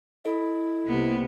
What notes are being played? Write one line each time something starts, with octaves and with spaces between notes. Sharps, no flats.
E4 A4 D#5
C2 C3 A#3 B3